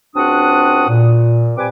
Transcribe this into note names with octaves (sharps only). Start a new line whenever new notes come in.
C#2 C4 D4 F#4 F#5 D#6
A#2
G3 C4 B4 G#5 D6